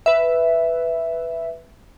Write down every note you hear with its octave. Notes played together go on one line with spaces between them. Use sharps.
B4 E5